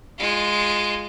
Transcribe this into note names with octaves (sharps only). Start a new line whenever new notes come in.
G#3 F4